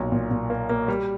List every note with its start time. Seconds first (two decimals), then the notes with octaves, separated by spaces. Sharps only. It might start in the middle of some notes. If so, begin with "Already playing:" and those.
Already playing: B1 A#2
0.12 A#2
0.31 A#2
0.50 A#3
0.69 A#3
0.88 G3